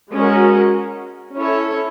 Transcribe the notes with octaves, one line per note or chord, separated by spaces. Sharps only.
G#3 C#4 F#4 A#4
C#4 E4 A4 C#5